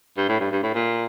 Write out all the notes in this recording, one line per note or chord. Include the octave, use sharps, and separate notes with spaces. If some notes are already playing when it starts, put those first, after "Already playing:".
G2
A2
G2
G2
A2
A#2